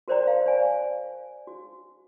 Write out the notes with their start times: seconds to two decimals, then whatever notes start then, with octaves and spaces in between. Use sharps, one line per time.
0.08 F#4 A#4 C5 D5 G5 A#5
0.27 F5
0.46 D5 G#5
1.47 F#4